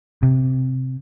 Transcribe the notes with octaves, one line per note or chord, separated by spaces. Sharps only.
C3